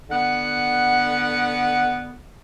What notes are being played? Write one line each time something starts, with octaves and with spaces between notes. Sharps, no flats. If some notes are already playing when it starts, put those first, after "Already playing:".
D3 B3 F#5